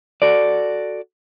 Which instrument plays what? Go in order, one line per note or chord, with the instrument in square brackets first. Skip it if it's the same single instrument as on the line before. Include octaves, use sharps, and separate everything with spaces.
[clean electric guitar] F#4 A4 D5